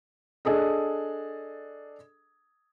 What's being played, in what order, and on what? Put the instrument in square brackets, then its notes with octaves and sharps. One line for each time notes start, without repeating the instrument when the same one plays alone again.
[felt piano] D4 G#4 A4 D#5